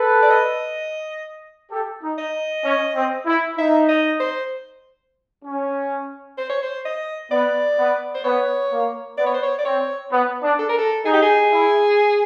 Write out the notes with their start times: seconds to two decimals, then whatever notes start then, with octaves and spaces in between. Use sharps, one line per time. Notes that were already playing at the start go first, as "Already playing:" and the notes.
Already playing: A4 B4
0.23 D5
0.31 D#5
1.71 G4 A4
2.02 D#4
2.18 D#5
2.64 C#4
2.95 C4
3.26 E4
3.58 D#4 E5
3.88 D#5
4.20 C5
5.44 C#4
6.37 C5
6.49 C#5
6.63 C5
6.85 D#5
7.31 B3 D5
7.78 B3
8.15 C5
8.24 B3 C#5
8.71 A#3
9.17 B3 D5
9.26 C#5
9.33 C5
9.43 C#5
9.58 D5
9.65 C4 C#5
10.11 B3
10.43 D4
10.59 A4
10.69 A#4
10.78 A4
11.05 D#4 G#4
11.13 G4
11.22 G#4
11.52 E4